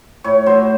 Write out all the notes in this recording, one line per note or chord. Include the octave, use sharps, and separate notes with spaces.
A2 C#5
F#3 C5